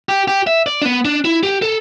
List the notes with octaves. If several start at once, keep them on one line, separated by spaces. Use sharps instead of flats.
G4
G4
E5
D5
D4
B3
D4
E4
G4
A4